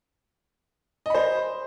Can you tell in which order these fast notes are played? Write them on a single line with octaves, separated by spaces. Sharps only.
D#5 B5 C5